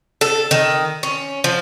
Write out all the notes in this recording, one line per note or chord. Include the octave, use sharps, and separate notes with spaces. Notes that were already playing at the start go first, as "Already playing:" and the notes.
A4
D#3
C#4
F3